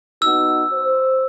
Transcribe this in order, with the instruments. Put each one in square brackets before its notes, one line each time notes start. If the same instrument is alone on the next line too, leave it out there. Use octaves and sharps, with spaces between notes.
[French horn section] B3 D#4 F#4 [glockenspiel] E6
[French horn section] C5